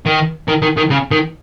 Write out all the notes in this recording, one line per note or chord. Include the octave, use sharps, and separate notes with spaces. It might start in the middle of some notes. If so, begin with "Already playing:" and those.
D#3
D#3
D#3
D#3
C#3
D#3